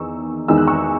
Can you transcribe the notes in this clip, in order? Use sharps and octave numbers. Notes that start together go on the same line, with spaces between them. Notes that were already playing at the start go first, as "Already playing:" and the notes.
Already playing: E2 D#3 D#4 C#6 E6
E2 D#3 G#3 D#4 E6
F#6
C#6 E6